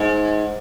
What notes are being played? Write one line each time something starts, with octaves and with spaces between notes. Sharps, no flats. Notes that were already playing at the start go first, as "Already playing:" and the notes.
Already playing: G#2